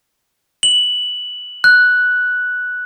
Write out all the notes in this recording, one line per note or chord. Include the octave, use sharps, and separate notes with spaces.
F#7
F#6